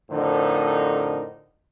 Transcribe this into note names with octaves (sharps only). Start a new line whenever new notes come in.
F2 A2 D3 D#4 A#4 C5